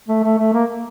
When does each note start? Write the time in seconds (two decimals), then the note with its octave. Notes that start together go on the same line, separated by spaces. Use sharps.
0.09 A3
0.23 A3
0.38 A3
0.53 A#3